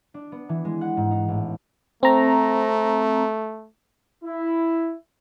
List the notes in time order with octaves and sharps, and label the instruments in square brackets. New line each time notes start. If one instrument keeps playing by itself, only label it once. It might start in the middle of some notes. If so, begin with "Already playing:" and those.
[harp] D4
B3
E3
G#3
F#5
G#2
D#4
A1
[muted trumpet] A3 [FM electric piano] C4 A#5
[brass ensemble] E4